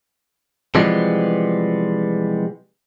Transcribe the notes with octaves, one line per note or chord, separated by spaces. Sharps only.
C3 E3 F3 G3 G#3 B3